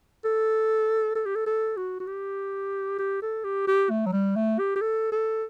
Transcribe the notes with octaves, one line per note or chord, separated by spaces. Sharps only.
A4
A4
G4
A4
A4
F#4
F#4
G4
G4
A4
G4
G4
A3
F#3
G3
A3
G4
G4
A4
A4